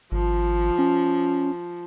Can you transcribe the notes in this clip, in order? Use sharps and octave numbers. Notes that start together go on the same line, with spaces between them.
G#1 F3
C#4